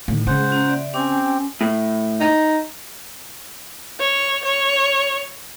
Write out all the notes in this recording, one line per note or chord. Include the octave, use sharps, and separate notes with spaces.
A2 D#3
C#3 G#3 G#4 C5 F#5
A#3 C#4 F4
D5 E5
C4 C#4 G4 G#5
A2
D#4
C#5
C#5